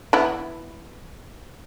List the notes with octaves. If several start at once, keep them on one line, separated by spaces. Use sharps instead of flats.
E3 B3 E4